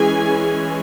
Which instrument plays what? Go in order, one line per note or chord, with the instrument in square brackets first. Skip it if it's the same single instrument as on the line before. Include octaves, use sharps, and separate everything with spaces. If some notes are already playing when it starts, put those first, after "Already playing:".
Already playing: [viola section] E3 G#3 C#4 G#4 G#5